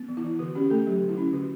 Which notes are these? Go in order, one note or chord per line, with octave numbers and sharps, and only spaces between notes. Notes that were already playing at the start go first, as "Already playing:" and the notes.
Already playing: B3
E3
E4
E3
D3 F#4
C#4 G4
A3 A4
F#3 G4
D3
E4
C#4
D3 F#4